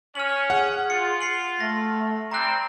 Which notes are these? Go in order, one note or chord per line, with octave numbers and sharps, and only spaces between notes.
C#4 F6 F#7
G#4 F#5
F4 C#7
C7 C#7 F#7
A3 A#6
G3 C4 A#5 F#6